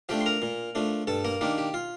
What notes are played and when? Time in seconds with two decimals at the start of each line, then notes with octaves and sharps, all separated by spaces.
0.09 F3 A3 D4 G4 G5
0.21 C6
0.26 A#4 A#5
0.42 A#2
0.75 F3 A3 D4
1.07 G2 A4 A5
1.25 A#3 A#4
1.41 D#3 A#3 D4 G4
1.58 G4
1.74 F4